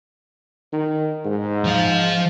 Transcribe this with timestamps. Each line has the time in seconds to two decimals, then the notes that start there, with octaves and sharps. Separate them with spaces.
0.73 D#3
1.25 G#2
1.64 F3 F5